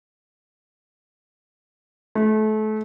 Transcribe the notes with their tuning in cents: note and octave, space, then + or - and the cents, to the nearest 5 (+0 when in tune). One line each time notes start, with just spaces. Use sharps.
A3 -30